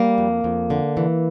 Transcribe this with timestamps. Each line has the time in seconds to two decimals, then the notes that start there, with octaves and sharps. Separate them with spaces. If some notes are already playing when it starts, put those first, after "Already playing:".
Already playing: G3 A#3
0.18 F2
0.44 F2
0.70 D3
0.97 E3